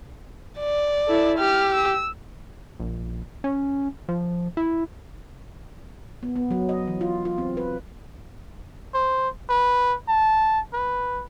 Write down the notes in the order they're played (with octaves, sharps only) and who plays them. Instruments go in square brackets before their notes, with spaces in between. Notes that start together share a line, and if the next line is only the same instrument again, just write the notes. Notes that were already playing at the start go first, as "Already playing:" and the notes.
[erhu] D5
[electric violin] E4 A4
[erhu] G4 [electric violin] F6
[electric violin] E6
[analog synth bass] A#1
C#4
F3
E4
[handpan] B3
B3
F#3
D#5
E3
F4
F4
C4
B4
[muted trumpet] C5
B4
A5
B4